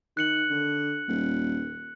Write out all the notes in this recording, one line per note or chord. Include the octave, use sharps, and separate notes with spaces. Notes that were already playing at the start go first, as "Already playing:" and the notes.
D#3 F#6 C#7 F#7
D3
D#1